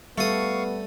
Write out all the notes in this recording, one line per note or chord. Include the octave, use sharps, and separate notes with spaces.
G3 A3 B3 A4 F5 C#6 D#6